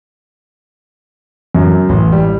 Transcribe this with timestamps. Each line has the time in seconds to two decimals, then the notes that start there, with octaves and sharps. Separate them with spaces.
1.55 F#2
1.89 A1
2.12 G3